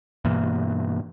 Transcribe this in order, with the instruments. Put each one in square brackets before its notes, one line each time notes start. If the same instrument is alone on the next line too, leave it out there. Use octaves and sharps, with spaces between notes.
[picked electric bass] G2 B2 E3 A#3